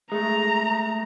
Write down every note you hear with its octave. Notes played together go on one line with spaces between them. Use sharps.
G#3 A3 A#5